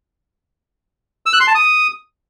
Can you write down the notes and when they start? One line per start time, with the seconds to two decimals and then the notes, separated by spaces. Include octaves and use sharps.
1.26 E6
1.33 F#6
1.40 C6
1.48 A5
1.55 D#6